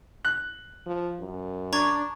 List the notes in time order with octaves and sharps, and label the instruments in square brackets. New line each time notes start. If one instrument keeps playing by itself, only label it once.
[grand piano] F#6
[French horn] F3
F#2
[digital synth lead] D4 [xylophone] A#5 C#6 G#6